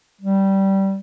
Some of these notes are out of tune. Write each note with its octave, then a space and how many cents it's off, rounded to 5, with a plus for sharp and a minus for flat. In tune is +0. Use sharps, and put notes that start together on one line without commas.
G3 -15